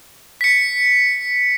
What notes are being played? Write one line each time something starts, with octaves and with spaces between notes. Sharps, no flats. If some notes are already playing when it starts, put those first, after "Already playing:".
B6 C#7